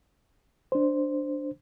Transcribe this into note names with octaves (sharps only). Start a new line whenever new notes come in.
D4 C5